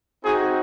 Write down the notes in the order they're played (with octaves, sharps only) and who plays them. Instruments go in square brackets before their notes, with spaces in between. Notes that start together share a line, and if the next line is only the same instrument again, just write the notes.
[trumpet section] C4 D#4 F#4 G#4